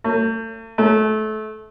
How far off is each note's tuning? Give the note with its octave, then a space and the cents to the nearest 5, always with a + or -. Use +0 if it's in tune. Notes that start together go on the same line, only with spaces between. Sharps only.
A3 +40
A3 -25